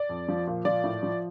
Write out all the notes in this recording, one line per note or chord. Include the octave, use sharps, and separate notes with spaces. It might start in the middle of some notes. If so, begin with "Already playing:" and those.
Already playing: D5
F2
F3
A#2
F3 D5
A2
F3